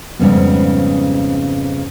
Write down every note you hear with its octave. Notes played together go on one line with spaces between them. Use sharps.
F2 G#2 C#3 G3 B3